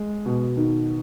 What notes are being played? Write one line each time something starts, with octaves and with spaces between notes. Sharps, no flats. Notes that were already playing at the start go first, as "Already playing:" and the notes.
Already playing: G#3
B2
D#3